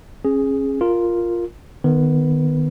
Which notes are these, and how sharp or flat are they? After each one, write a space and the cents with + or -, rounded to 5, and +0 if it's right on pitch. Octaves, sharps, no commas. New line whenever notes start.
C#4 -30 G#4 +0
F4 +0 A#4 -5
D#3 -25 B3 +0 B4 +0